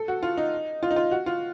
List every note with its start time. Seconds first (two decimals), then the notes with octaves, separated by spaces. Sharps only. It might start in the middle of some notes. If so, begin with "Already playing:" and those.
Already playing: A4
0.08 F#4
0.23 F4
0.37 D#4
0.83 F4
0.91 D#4
0.96 F4
1.11 F#4
1.26 F4